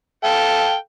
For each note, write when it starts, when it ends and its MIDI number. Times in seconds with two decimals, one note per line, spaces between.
0.24 0.75 69
0.24 0.75 77
0.24 0.75 79